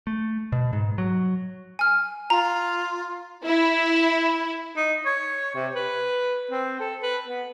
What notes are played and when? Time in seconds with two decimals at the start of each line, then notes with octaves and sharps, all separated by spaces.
0.07 A3
0.52 B2
0.73 G#2
0.98 F#3
1.79 G#5 F6
2.30 F4 A#5
3.45 E4
4.76 D#4
5.06 C#5
5.55 C3
5.75 B4
6.51 C4
6.80 A4
7.02 B4
7.27 B3